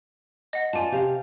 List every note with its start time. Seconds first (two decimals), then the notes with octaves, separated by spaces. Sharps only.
0.53 D#5 F#5
0.73 F4 C5 D5 G#5 A5
0.92 C3 G4 F5